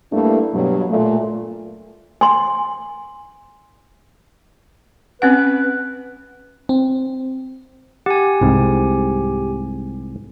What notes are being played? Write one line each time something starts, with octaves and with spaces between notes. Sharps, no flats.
G2 A3 A#3 D4 E4
G2 B2 F#3
A#2 A3
G#5 C6
C4 C#4 B4 F#5
C4
G4 F#5 G#5
C2 G#2